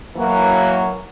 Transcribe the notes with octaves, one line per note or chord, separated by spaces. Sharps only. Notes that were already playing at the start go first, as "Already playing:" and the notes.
E3 F#3 A#3